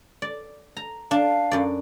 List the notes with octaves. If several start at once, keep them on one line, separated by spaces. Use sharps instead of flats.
D5
A#5
D4 F5
F#2 D5